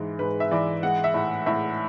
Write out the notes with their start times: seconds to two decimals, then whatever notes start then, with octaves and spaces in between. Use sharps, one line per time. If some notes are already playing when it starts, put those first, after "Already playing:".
Already playing: G#2 E3
0.19 G#2 B4
0.40 E5
0.51 E3 D5
0.83 G#3 F#5
1.04 E5
1.14 A2
1.46 A2 E5